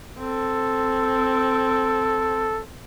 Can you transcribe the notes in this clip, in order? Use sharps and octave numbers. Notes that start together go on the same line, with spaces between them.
C4 A4